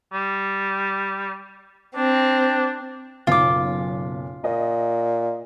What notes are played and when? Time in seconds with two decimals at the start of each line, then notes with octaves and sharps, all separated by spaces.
0.13 G3
1.96 C4 D4
3.27 F#1 B1 F4 D6
4.44 A#2 D#5